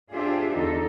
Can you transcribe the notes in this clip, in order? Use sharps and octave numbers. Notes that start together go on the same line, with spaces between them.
D4 F4 G4 G#4 C5 E5
E2 D3 D#4 A4